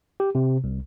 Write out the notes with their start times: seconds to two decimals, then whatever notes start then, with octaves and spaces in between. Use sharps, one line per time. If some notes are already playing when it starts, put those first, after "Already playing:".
0.20 G4
0.35 C3
0.64 C2